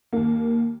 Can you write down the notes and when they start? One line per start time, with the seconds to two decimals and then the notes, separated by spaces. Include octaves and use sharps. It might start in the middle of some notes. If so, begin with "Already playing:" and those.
0.13 D#2 A#3